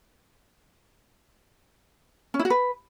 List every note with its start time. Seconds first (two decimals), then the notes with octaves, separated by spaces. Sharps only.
2.34 C#4
2.39 E4
2.45 F#4
2.50 B4